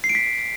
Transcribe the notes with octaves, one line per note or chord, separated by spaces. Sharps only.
C7
D7
B6